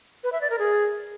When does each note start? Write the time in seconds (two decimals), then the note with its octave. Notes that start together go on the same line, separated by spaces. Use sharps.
0.24 B4
0.32 E5
0.41 D5
0.50 A#4
0.59 G#4